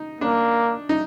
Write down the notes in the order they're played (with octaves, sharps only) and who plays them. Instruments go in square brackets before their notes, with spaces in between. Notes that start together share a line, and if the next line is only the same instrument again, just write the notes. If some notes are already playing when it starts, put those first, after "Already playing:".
Already playing: [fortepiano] D#4
[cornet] A#3 [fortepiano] D4
[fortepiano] D#4